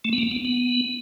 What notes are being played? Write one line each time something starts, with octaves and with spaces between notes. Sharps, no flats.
A3
B3
A#3
B3
B3